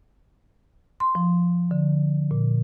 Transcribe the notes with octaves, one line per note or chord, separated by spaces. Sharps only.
C6
F3
D3
A#2